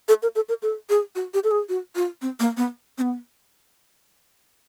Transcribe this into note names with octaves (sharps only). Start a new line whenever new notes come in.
A4
A#4
A4
A#4
A4
G#4
F#4
G4
A4
G#4
F#4
F4
C4
A#3
B3
C4
B3